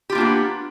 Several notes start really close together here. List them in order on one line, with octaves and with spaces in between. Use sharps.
G4 F4 A#3 D4 B3